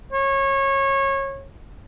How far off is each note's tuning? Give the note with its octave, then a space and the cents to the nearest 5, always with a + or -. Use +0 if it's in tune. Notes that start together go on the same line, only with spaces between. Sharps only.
C#5 -25